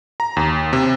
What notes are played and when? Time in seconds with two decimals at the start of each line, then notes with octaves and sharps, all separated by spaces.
0.20 A#5
0.37 D#2
0.73 C3